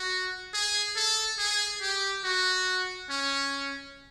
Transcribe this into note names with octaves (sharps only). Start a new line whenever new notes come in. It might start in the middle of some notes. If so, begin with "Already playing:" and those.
Already playing: F#4
G#4
A4
G#4
G4
F#4
C#4